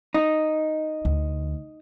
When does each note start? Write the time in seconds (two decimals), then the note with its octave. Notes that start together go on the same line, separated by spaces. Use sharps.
0.14 D#4
1.05 D2